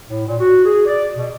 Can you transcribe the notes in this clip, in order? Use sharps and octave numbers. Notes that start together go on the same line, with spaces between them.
A2
A#2
F#4
G#4
D5
B2